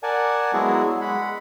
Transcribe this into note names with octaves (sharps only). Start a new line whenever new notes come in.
A#4 D5 F#5 G#5 A5
F#3 G#3 B3 E4 F#4 G#4
G#3 F#5 B5